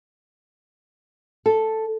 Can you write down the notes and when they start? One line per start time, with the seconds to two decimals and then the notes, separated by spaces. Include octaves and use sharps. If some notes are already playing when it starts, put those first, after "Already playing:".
1.46 A4